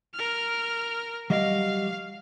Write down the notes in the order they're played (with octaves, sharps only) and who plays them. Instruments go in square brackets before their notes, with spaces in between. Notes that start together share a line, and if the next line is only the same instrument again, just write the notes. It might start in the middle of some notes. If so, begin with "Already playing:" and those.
[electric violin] A#4 F6
[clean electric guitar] F#3 G3 D#5 [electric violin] F5